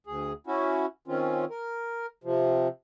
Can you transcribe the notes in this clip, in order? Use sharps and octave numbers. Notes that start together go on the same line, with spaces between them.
D2 G#4
C#4 E4 F#4
D#3 C4 C#4 F4
A#4
C3 F3